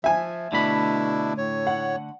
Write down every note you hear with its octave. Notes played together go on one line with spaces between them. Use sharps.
F3 E5 G#5
B2 D3 A3 D4 E4 B5
A2 C#5
F#5